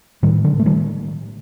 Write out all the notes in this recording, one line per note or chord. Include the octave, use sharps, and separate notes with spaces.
A2 D#3 G3
D3 F#3
A3
D#3 G3